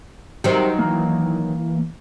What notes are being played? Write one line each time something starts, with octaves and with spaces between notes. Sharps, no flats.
D#3 F#3 G4 C5
E3 A#3